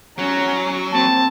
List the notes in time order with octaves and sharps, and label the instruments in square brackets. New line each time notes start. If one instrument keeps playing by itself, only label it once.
[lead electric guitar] F#3 [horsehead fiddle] C#4 A#5
[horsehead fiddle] A#3 C4 [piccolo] A5